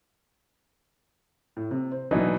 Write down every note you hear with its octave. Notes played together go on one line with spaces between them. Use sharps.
A2
C3
C5
B2 E3 F#3 D4 D#4